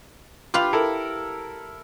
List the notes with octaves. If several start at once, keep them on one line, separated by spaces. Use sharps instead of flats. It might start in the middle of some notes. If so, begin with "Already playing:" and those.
F4 G4 B4 F5
E4 A4 A#4